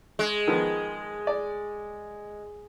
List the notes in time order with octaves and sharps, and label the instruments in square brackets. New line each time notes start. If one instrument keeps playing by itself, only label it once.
[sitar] G#3
[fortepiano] D#3 F3 B3
D5